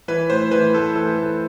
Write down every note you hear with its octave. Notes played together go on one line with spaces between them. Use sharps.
E3 B4
A2 C5
E3 B4
A2 A4
E3 A4
A2